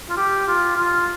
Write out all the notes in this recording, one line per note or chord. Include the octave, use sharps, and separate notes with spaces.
F4
G4
F4
F4